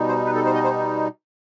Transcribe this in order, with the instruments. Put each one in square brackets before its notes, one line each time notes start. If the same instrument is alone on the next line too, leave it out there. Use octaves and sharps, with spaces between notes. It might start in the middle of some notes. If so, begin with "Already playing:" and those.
Already playing: [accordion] B2 G3 D#4
C5
B4
A4
C5
D#5
C5